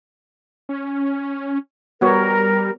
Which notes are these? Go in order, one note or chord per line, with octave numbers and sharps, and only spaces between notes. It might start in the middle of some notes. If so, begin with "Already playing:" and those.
C#4
G3 B3 F#4 A#4 C#5